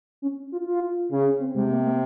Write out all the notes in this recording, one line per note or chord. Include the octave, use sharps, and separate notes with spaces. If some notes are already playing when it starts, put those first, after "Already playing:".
C#4
F4
F4
C#3 C#4
C#4
C4
C3 G#3
A#3
A#3